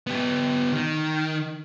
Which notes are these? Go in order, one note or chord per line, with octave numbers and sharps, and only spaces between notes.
B3 G4
D#3